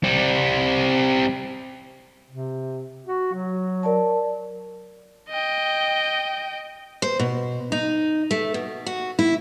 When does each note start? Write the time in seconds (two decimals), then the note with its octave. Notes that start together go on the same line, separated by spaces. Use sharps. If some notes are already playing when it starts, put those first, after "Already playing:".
0.04 G3 C4
2.29 C3
3.07 F#4
3.33 F#3
3.83 A#4 D5 A5
5.30 D#5 G5
7.02 C5
7.19 B2
7.72 D#4
8.31 A3
8.54 B2
8.86 F#4
9.19 E4